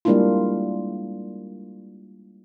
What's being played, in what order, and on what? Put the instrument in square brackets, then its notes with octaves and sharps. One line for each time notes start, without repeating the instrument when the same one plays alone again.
[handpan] G3 G#3 A#3 D4 E4 F4